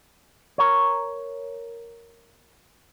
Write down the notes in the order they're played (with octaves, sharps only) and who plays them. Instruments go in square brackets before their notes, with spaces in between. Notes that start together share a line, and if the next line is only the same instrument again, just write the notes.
[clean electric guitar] A#4 C#5